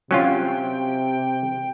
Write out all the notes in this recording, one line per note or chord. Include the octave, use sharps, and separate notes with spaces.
C3 F#3 C#4 F4 G5